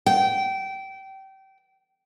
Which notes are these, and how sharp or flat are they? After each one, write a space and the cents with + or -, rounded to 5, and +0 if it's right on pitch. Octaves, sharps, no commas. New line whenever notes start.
G5 -25